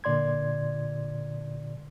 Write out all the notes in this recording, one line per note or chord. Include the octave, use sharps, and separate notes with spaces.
A#2 D3 D5 C6 G#6